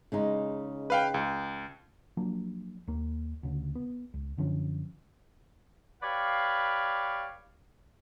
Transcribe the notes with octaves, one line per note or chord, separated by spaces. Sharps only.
C#3 G#3 D#4
B4 F5 G5
C#2
F3 F#3 A#3 D4
D#2 A#3
D2 C#3
B3
C#2
F#2 D3 F3 C#4
G4 B4 C#5 D5 F5